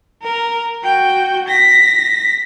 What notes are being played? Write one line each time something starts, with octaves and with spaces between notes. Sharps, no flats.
A#4
F#4 G5
A#6 B6